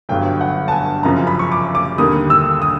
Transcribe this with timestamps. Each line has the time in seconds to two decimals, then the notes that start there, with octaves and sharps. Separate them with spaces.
0.09 G1 G2 D3 F#3 G5
0.41 F#5
0.68 A5
0.72 G#5
1.03 F#1 F#2 C#3 F3 A#5
1.27 B5
1.39 C#6
1.52 D6
1.75 D6
1.98 D#2 D3 G3 A#3 D#6
2.30 E6
2.62 D#6